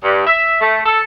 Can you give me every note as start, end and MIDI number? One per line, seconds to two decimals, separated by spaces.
0.03 0.25 43
0.26 0.56 76
0.61 0.80 57
0.86 1.01 69